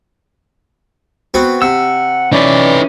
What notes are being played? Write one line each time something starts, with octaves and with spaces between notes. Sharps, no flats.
B3 C4 F#4
C3 F#5 E6
E3 C#4 D#4 B4 D5